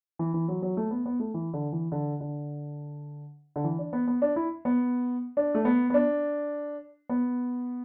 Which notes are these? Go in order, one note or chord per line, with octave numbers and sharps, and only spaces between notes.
E3
E3
F#3
F#3
A3
B3
B3
A3
E3
D3
E3
D3
D3
D3
E3
D4
B3
B3
D4
E4
B3
D4
A3
B3
B3
D4
B3